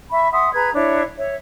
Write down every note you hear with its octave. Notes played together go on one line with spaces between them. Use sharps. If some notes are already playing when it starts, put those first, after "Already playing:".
E5 B5 C#6
E5 F#5 C6 D#6
G#4 B4 A#5 G#6
D4 E4 C#5 E5
C#5 E5